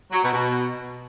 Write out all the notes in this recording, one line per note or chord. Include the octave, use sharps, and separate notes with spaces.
F#3
B2
B2